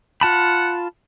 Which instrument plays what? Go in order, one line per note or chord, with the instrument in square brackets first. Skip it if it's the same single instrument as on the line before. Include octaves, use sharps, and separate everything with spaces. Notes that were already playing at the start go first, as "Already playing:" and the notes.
[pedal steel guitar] F4 A5 B5 [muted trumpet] F#5